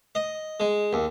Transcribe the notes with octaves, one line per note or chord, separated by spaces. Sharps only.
D#5
G#3
D#2